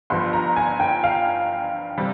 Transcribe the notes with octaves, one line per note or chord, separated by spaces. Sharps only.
G1 G2 F3 C6
A#5
G#5
G5
F5
C3 G3